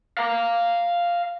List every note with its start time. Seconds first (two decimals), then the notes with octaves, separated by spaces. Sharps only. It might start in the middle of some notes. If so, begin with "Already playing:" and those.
0.17 F5 A#5